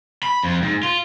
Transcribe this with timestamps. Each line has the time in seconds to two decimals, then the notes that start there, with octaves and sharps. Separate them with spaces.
0.23 B5
0.43 F2
0.62 G#2
0.83 F4